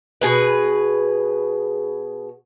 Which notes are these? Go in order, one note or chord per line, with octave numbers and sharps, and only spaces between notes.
B2 G#4 B4